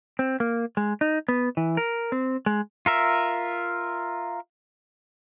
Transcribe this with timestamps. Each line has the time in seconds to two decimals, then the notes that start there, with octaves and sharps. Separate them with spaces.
0.19 C4
0.40 A#3
0.77 G#3
1.01 D#4
1.28 B3
1.57 E3
1.77 A#4
2.12 C4
2.46 G#3
2.86 F4 A#4 E5